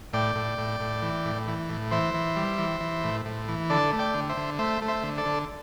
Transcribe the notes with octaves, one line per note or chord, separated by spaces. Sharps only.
A2 D5 G5
A2
A2
A2
E3
A2
E3
A2
E3 C5 E5
E3
G3
E3
E3
A2
A2
E3
D3 A4 D5
A3
D5 G5
D3
C5 E5
D3
A3 C5 E5
A3
C5 E5
D3
A4 D5
D3